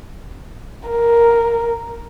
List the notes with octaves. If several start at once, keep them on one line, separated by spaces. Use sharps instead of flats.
A#4